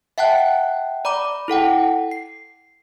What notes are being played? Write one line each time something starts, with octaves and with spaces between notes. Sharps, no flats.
E5 F#5 G5 A5 F#6
D5 A#5 B5 D6
E4 A4 F#5 G5
C7